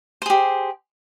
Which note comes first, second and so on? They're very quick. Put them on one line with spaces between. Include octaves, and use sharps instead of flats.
C5 G#4 G4